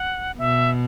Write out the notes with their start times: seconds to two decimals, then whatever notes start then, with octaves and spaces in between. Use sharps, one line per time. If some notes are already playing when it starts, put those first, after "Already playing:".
Already playing: F#5
0.39 B2 E5